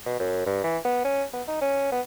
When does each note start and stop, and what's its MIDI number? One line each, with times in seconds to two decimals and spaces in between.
0.06 0.17 47
0.20 0.42 42
0.46 0.60 43
0.63 0.78 52
0.85 1.02 59
1.04 1.24 61
1.33 1.42 59
1.47 1.61 63
1.61 1.90 61
1.92 2.01 59